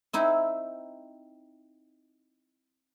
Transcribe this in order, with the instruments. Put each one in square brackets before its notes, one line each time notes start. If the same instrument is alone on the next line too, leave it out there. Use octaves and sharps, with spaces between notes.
[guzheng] C4 D#4 E4